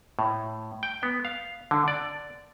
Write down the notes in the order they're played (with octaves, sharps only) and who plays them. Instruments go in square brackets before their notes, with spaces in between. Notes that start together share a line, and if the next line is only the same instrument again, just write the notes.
[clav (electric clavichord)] A2
G5
B3
F5
D3
D5